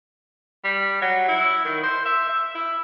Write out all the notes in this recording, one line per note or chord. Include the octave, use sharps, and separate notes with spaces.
G3
F#3
E4
D#3
C5
E5
E5
E4